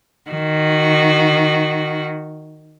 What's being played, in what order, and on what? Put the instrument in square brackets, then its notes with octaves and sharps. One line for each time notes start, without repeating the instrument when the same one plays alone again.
[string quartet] D#3 F#4